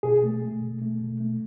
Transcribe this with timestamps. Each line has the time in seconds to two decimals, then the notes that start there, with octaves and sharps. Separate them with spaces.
0.03 B2 G#4
0.23 A3
0.42 A3
0.62 B2
0.81 A3
1.01 B2
1.20 A3